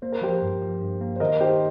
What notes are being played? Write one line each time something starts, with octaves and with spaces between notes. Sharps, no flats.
A#3 C5
A#4
F3 G4 C5
G2
F3
G2
A#3
C5
D#3 A#4 D#5
D#3 G4 C5